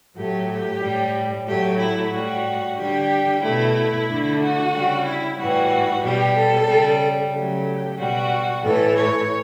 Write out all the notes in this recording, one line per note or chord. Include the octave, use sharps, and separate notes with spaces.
A2 F#3 A3 G4
G4
A2 G3
A2 F#3 A3 G4
E4
A2 G3 F#4
D3 G3 G4
B2 A3 E4
D3 A3
F#4
C#3 G3
E4
A2 E3 G3 F#4
B2 G3 G4
A4
C#3 G3
C#3 F#3 A3 G4
B2 G3 F#4
A2 E3 A3 A4
C#5